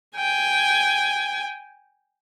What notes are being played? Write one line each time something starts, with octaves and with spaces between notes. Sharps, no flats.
G5 G#5